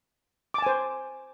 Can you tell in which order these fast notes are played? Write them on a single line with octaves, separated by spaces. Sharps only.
D6 A5 G#5 C5